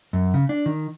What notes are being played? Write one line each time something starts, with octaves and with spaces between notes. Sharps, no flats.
F#2
C#3
D4
D#3